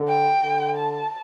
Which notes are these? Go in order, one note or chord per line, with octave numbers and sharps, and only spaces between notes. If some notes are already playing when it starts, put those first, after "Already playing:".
Already playing: D3
G5
D3
A5